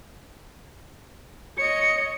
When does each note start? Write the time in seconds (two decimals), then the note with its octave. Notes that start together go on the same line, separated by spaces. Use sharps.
1.58 C#5 D#5 C#7